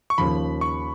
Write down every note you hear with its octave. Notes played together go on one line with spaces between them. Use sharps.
C#6
D#2 C#3 F3 B5
C#6